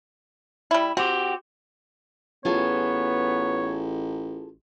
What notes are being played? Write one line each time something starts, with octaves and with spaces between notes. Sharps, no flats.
G3 E4
C4 F#4 G4
A1 B3 F4 G#4 A4 C#5